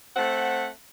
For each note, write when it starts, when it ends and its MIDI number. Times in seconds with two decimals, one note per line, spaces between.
0.16 0.68 57
0.16 0.68 60
0.16 0.68 78